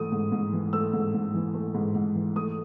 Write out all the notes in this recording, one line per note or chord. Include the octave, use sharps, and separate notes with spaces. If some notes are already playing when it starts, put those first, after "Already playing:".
Already playing: G#2 E3 A3 D#6
G#2
G#2
E3
A3 E6
G#2
G#2
E3
A3
G#2
G#2
E3
A3 D#6